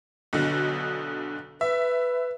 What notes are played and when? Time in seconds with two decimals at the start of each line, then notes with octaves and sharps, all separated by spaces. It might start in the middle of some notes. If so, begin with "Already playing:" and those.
0.33 B1 B2 D3
1.61 B4 E5